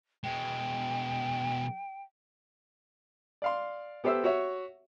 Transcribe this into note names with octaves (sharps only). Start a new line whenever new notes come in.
B2 G#3 G5
D5 F5 C6
B3 G4 A4 C5 E5 E6
F#4 C#5 E5